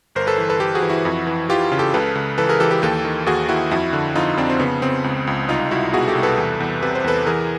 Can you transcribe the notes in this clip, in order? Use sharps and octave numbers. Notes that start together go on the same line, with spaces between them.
G1 A#4 C5
A4 B4
E3
A4 B4
E3 G4 A4
F#4 G#4
E3
E4 F#4
F2
E3
E3 F4 G4
C#3
G4 A4
C#2 A4 B4
C#2
E3 A4 B4
G#4 A#4
E3 G4 A4
G4 A4
D#2 G4 A4
D#3
D#2 F#4 G#4
D#2 E4 F#4
F2 E4 F#4
D3
F2 D#4 F4
F2 C4 D4
C4
C#3 B3
C#3 C4
C#2
C#2
C2 D#4 F4
C2 E4 F#4
B2 F#4 G#4
G4 A4
C2
A4 B4
E2
E2
C3 B4
C5
E2 A4 B4
E3 G#4 A#4